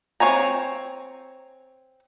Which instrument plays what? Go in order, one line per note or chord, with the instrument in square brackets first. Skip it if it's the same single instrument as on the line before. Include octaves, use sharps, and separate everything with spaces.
[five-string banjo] C4 F4 C#5 G#5 A#5